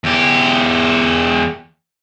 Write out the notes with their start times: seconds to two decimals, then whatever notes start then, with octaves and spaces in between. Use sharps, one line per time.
0.04 E2 G4